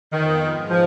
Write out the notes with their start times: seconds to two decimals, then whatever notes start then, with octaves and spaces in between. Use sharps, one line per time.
0.12 F2 D#3 F3 B3 F4
0.41 G#2 F3 G#3 D#4
0.70 F3